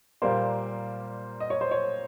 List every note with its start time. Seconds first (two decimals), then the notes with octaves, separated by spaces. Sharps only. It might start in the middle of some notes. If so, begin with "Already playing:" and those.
0.22 A#2 G3 A#3 C5
1.40 D#5
1.50 C#5
1.61 C5
1.71 C#5